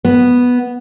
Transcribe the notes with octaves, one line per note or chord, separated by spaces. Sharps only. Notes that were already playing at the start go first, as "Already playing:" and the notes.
B3